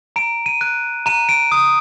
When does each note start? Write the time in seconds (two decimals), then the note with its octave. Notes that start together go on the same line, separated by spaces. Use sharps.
0.16 A#5 D7
0.46 D#7
0.61 F#6
1.06 A#5 D#7
1.29 D7
1.52 D#6